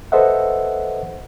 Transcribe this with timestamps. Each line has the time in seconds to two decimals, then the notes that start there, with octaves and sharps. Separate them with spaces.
0.12 A4 B4 C5 D#5 E5 F#5